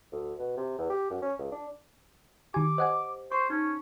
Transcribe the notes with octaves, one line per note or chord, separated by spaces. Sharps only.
D2
B2
C3
E2
G4
F#2
C#4
C#2
D4
D#3 G4 G#5 D6
C5 D#5 F#5 G#5
C5 C#6
C#4 D#4